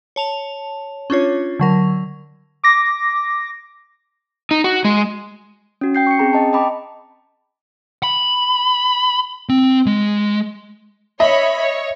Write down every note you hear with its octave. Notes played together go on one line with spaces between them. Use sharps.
C#5 A5 F7
C#4 D4 F4 C#5
D3 F#3 A#4
D6 A#6
D#4
F#4
G#3
C#4 F#4
G5 G6 C7
C#6 C#7
C4 C#4 G#4 G5 A#5
D#5 A5
D#5 G5 A#5 B5 D6
B5
C4
G#3
C#5 D#5 E5 B5
C#5